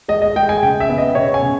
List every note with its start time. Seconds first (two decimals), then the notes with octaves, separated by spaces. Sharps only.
0.08 G#3 D#5
0.22 D#5
0.36 G#3 G5
0.49 G#5
0.63 C#3 G5
0.80 E5
0.90 B3
0.98 D#5
1.15 C#3 C#5
1.34 G#5
1.42 C#3